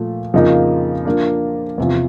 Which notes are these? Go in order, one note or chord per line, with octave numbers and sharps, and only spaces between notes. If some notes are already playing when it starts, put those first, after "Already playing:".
Already playing: A#2 F3 A3
F2 C#3 F3 A#3 D#4
F3 A#3 D4
E2 C3 F3